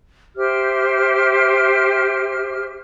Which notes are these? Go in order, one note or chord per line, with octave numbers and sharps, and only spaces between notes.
G4 C5 E5 F6